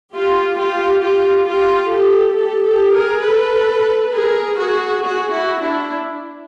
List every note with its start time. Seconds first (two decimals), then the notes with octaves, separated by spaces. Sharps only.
0.13 F4 G4
0.57 F4 G4
1.02 F4 G4
1.46 F4 G4
1.91 G4 A4
2.35 G4 A4
2.65 G4 A4
2.94 G#4 A#4
3.24 A4 B4
4.13 G#4 A#4
4.58 F#4 G#4
5.03 F#4 G#4
5.32 E4 F#4
5.62 D4 E4